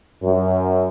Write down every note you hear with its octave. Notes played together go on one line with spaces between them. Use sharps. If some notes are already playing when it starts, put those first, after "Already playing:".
F#2